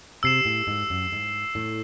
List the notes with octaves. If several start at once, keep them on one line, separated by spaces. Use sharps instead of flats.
C3 E6 C7 E7
A2
G#2
F#2
G#2
A2